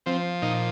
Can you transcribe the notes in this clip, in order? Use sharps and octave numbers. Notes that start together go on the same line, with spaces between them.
F3 C4
A#2 D#4